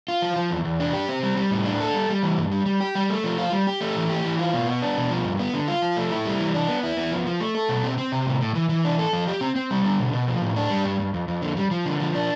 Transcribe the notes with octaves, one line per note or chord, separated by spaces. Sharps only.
F4
F3
F3
E2
E2
D4
G4
C4
G3
G3
A2
D4
A4
G3
G3
E3
G2
G3
G3
G4
G3
A3
F3
F4
G3
G4
A3
E3
G4
E3
F4
B2
B3
D4
B2
F3
G2
B3
D3
F4
F3
A3
E4
G3
E3
D4
B3
E4
B3
F3
F3
A3
A4
B2
C4
C4
C3
A2
A2
E3
E3
D4
A4
F3
G4
C4
C4
G3
D3
B2
B2
F3
A2
D4
G3
G2
G2
F2
F2
D3
G3
F3
D3
F3
D4